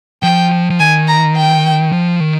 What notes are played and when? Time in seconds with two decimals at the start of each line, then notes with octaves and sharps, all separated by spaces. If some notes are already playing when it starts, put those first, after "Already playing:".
0.22 F3 G5
0.70 F3
0.79 D#3 G#5
1.07 A#5
1.36 G5
1.92 F3
2.20 D#3